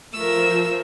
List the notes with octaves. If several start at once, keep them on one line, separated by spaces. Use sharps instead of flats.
F3 A3 A#4 E6